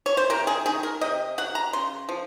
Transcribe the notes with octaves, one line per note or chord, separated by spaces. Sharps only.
C#5
C5
C3 A#4
G#4
D#3 G#4
A#4
C3 D#5
F#3 F#5
A#5
C#3 C6
F3